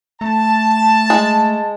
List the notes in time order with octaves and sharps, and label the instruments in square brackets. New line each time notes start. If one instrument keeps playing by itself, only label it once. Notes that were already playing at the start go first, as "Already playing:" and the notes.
[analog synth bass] A3 [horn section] A5
[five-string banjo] G#3